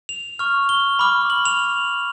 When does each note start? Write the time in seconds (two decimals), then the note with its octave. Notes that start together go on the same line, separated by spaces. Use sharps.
0.09 F7
0.39 C#6 F6
0.69 G7
0.99 B5 D6 F6
1.30 F#7
1.45 F7